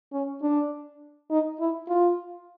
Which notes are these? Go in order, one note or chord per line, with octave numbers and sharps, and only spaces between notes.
C#4
D4
D#4
E4
F4